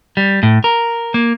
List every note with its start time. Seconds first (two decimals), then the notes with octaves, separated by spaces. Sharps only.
0.17 G3
0.43 A2
0.64 A#4
1.14 A#3